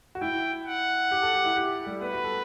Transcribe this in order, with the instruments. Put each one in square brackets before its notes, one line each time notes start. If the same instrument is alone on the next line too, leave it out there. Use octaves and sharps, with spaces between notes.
[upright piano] F#4
[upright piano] E4 [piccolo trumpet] G5
[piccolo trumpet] F#5
[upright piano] G4
A4
G4
E4
G4
G3
[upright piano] B3 [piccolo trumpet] B4
[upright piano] F#4
A4